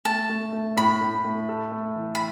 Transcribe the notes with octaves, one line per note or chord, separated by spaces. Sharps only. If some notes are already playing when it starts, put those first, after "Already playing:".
A3 A5
A3
A3
A2 B5
A2
A3
A4
A3
E3
B5